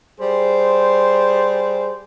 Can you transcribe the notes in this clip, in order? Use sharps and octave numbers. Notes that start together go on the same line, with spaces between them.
G3 G#4 C5